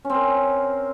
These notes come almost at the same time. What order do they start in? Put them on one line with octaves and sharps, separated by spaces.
C#4 C4 A#4